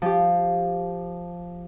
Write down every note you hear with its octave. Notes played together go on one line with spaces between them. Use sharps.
F3 G4